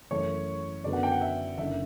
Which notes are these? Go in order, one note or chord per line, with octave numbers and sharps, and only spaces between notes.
F#2 E3 A3 C#5
F#2 D3 F#3 B3 D5
F#5
G5
F#5
E5
F#1 F#2 D3 E5